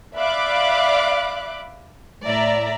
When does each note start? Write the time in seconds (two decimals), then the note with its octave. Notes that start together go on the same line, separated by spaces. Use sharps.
0.17 D5 E5 F5 B5 D6 F#6
2.23 A2 D5 E5 A#5